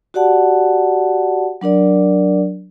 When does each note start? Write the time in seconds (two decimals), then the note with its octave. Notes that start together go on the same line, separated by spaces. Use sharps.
0.14 F#4 G4 D5 F#5 A5
1.61 F#3 D4 A#4 D5